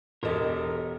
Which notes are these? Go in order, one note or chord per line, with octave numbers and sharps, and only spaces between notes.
E1 G4 A4 A#4 D#5